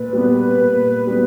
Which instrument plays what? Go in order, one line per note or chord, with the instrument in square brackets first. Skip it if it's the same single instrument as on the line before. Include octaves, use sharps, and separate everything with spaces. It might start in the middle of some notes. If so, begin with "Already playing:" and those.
Already playing: [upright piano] A#2 [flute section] B4
[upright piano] G3 B3
A#2
G3 B3